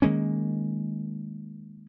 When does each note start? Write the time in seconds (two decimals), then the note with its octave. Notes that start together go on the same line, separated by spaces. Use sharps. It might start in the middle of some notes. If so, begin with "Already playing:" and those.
0.02 D#3 G#3 A#3 C#4